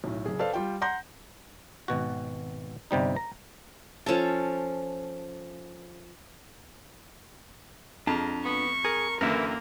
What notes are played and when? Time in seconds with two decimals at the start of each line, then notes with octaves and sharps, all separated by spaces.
0.04 B1 A2
0.26 F#1 G#4
0.39 A4 B4 C5 D5 F5
0.53 G3 F4 G5
0.81 F#5 A#5 C6 G6 A#6
1.88 G#1 B2 F#4
2.91 G1 C3 G3 D#4
3.16 A#5
4.06 F3 C#4 A4 A5
8.07 F2 G#3 D4 F4 A#5
8.45 B3 C#6
8.85 G#4 A#4
9.21 F#2 D3 E3 A#3 E4 A#4 B4